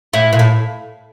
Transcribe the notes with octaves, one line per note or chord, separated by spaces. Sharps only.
A2 E4
A#2
A2